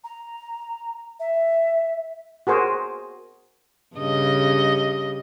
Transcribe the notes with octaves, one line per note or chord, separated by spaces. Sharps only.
A#5
E5
F#4 G#4 A#4 C5
G2 C#3 D#5